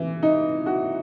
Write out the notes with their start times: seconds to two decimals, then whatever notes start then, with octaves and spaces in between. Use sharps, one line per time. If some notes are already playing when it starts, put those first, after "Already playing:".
Already playing: E3
0.23 D#4
0.66 F#4